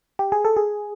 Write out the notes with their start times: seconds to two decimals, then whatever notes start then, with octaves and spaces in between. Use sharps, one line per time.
0.19 G4
0.32 G#4
0.45 A4
0.57 G#4